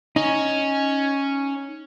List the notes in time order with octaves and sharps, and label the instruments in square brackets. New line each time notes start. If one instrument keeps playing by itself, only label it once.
[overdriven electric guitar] C#4 [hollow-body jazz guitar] D#4